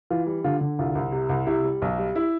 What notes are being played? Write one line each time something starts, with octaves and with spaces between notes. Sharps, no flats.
E3 F4
G3
D3 F4
D3
C2 F4
C2
C3
C2
C3 E4
G3
B1
G3
E4